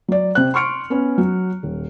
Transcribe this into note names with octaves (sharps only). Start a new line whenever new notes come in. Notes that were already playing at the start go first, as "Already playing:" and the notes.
F#3 D5
C3 C5 F#6
C6 C#6 F6 C#7 D7
B3 C#4 B4
F#3
D#1